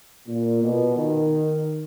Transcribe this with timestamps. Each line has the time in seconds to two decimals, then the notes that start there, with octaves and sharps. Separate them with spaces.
0.28 A#2
0.63 B2
0.97 D#3